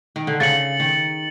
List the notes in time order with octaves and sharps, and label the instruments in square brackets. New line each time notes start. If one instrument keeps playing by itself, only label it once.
[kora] D#3
D3
[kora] C#3 [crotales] A6 C#7 F#7
[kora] D#3